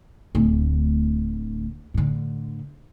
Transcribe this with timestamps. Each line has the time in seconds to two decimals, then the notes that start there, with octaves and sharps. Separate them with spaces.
0.35 D1 D2
1.94 A2 D3